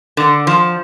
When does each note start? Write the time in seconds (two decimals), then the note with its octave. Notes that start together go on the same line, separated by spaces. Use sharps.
0.17 D3
0.47 F3